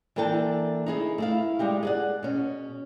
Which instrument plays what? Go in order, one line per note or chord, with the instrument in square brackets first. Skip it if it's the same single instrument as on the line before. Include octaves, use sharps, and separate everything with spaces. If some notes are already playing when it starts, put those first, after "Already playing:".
[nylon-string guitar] E3 A#3 D4 A4 G5 A5
D#4 E4 G#4
A3 E4 F5
G3 G#3 D#4 G4
G#4 D5 F#5
B2 C#4